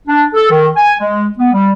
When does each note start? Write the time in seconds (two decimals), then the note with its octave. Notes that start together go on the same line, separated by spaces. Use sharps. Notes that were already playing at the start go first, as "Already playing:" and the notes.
0.08 D4
0.34 A4
0.51 D#3
0.77 G#5
0.99 G#3
1.39 B3
1.53 G3